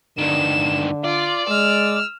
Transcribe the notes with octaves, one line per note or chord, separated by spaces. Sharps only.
G2 D3 D#3 E7
F4 D5
G#3 E6 F6